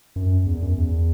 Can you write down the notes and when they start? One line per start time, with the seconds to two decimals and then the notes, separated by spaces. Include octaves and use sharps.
0.16 F#2
0.46 E2
0.62 F#2
0.78 E2